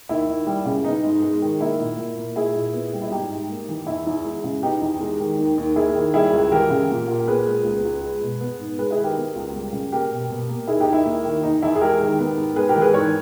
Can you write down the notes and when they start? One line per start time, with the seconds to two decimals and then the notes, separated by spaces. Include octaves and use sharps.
0.09 D#2 E4
0.28 D#2
0.47 G3
0.65 C#3
0.84 B3 D#4
1.04 G#2
1.22 G#3
1.42 D#3
1.60 A#3 E4
1.79 A#2
1.98 A#2
2.17 A#3
2.36 A#2 E4 G#4
2.55 A#2
2.73 B3
2.93 G3
3.02 E4
3.11 G#2 D#4 G4
3.30 G#2
3.50 A#3
3.69 E3
3.87 E2 E4
4.07 E2
4.25 G#3
4.44 C#3
4.63 B3 D#4 G4
4.81 E2
5.01 G#3
5.20 D#3
5.38 D#2
5.58 D#2
5.76 A#3 E4 G#4
5.95 D#3
6.14 G3 E4 G#4
6.33 C#2
6.51 E3 G4 A#4
6.70 C#3
6.90 A#2
7.08 A#2
7.28 B3 G#4 B4
7.46 G#3
7.65 C#2
7.85 C#2
8.04 G#3
8.22 B2
8.41 B3
8.59 G#2
8.79 G#3 G#4 B4
8.91 E4 G#4
8.98 D#3
9.03 G4 A#4
9.16 B3
9.36 C#2
9.55 G3
9.73 C#3
9.92 A#3 G4 A#4
10.12 B2
10.30 B2
10.49 A#3
10.68 D#2 E4 G#4
10.80 D#4 G4
10.86 D#2
10.93 E4
11.05 A#3
11.25 D#3
11.43 E2 D#4
11.62 E2 E4
11.76 G#4
11.81 G#3 G4 A#4
12.00 D#3
12.18 B3
12.38 G#2
12.56 G#3 G#4 B4
12.69 G4 A#4
12.76 E3
12.81 G#4 B4
12.94 G#2 A#4 C#5